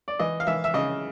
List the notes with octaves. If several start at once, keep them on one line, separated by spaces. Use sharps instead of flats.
D5
E3 D#5
F5
E3 E5
E5
C#3 D#5